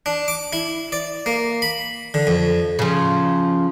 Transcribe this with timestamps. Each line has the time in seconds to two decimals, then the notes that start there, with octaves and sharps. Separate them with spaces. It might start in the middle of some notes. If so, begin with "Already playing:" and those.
0.06 D4
0.28 D6
0.53 E4
0.92 D5
1.26 A#3
1.62 B5
2.14 D3
2.27 F2
2.79 C#3 F3